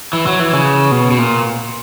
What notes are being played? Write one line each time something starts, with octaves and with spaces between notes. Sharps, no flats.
E3
F#3
E3
C#3
B2
B2
A#2